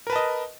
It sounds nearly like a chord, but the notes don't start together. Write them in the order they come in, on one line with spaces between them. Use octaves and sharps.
A#4 B4 A5 D#5